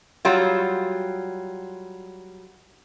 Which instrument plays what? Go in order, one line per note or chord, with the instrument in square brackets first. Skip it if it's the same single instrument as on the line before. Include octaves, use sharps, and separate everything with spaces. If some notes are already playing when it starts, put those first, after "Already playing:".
[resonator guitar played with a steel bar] F#3 G3 F4